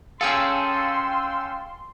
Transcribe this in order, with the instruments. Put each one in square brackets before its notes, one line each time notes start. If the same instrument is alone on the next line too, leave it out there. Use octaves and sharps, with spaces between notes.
[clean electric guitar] C#4 G#4 A4 [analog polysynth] F5 G5 E6 [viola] C6